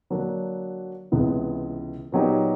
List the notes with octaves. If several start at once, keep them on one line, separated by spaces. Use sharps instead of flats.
D3 F#3 A#3 D4 F#4
C#2 C3 E3 G#3 B3
A#2 F#3 B3 D#4 G4